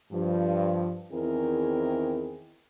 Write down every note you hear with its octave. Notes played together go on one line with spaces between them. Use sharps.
G2 F3
E2 D#3 C4 E4 G#4 A#4